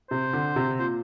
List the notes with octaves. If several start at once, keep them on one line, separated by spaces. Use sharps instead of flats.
C3 C5
D3
C3
A#2 C5